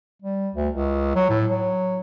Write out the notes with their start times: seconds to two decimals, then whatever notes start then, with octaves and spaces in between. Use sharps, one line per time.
0.22 G3
0.55 D2
0.74 C#2
1.16 F#3
1.29 A2
1.50 F#3